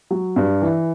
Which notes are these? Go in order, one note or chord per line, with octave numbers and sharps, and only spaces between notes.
F#3
G2
E3